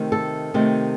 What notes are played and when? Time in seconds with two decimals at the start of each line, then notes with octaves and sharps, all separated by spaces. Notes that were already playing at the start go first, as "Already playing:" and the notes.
Already playing: C3 D#3 A3
0.12 A4
0.54 C3 D#3 A3